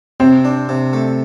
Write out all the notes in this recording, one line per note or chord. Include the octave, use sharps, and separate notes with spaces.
C3 C4
D4
C3
A3